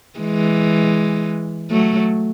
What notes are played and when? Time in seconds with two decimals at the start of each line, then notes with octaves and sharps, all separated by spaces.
0.19 E3 G#3
1.71 F#3 A3